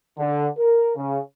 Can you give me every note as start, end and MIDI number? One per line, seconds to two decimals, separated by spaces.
0.18 0.48 50
0.58 0.92 70
0.96 1.20 49